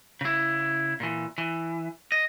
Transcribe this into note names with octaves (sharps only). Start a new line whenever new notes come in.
C#3 E4
A#2 E3
E3
D#5